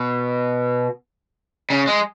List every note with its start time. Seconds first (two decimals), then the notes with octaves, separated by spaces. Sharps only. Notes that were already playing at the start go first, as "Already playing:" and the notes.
Already playing: B2
1.70 C#3
1.87 G#3